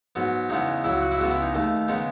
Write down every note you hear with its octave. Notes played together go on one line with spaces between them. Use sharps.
G#2 F#3 B3
E2 C#3 G#3 B3 D#4
C#2 C#3 F#3 E4
F#4
E4
C#2 C#3 G#3 B3 F#4
E4
D#4
D#2 D#3 A3
C#3 G#3 B3 D#4